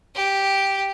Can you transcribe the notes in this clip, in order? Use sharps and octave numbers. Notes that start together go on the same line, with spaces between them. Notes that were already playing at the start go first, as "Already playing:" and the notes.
G4